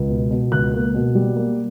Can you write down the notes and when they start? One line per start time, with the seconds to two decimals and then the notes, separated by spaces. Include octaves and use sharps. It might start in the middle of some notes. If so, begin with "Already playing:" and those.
Already playing: C#2
0.09 B2
0.31 B2
0.52 C#2 F#6
0.73 A#3
0.94 B2
1.15 G3
1.36 A#3